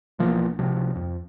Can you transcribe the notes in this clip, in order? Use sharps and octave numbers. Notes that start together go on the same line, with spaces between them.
B1 E3 F3 A#3
C#2 C3 F3
F2